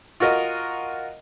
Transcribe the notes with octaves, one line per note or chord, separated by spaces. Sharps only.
F4 F#4 A#4 D#5